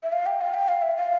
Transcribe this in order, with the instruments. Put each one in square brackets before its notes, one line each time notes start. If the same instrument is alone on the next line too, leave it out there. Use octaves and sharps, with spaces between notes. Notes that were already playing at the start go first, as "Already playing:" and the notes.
[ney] E5
F5
G5
F5
G5
F5
E5
F5